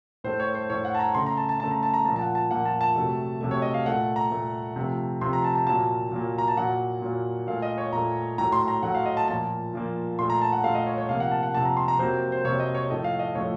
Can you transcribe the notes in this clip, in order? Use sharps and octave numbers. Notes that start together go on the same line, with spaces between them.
A2 A3 C5
C#5
C5
A2 A3 C#5
F#5
A5
A#5
C#3 A3 C6
A#5
A5
A5
C#3 A3 A5
A#5
A5
A#5
A#2 F3 A#3 A5
A5
F#5
A5
A#2 F3 A#3 F#5
A5
A5
C3 F#3 A3
C3 F#3 A3
C#5
D#5
F5
A#2 A3 F#5
A#5
A#2 A3
C3 F3 A3
C3 F3 A3 C6
A#5
A5
A5
A#2 F#3 A#3 A5
A#2 F#3 A#3
A#5
A5
A#2 F#3 A#3 F#5
A#2 F#3 A#3
A#2 A3 F5
D#5
C#5
A#2 A3 A#5
A2 F#3 A3 A#5
C6
A#5
A2 F#3 A3 F#5
F5
D#5
A5
A#2 F3 A#3 A5
A#2 F3 A#3
A#2 A3 C6
A#5
A5
F#5
A#2 A3 F5
D#5
C#5
C#5
C3 F3 A#3 F5
F#5
A5
F#5
C3 F3 A#3 A5
A#5
C6
A#5
C3 F#3 A#3 C5
C5
C3 F#3 A#3 C#5
D#5
C#5
A2 F3 A3 D#5
F5
D#5
A2 F3 A3 C#5